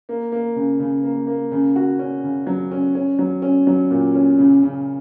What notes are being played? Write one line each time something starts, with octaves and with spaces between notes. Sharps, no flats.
A#3
A#3
C#3
C#3
A#3
A#3
C#3
F#4
C#4
C#3
F#3
C#4
C#4
F#3
C#4
F#3
A#2
C#4
C#3
C#3